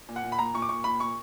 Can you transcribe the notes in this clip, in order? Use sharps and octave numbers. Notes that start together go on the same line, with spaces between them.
A#2
F#5
A#2
B5
A#2 A#5
A#2 C#6
D6
A#2 C#6
A#2 B5
A#2 C#6